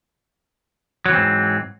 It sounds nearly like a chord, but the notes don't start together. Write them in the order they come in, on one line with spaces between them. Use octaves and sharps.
F#3 E3 C4 G#2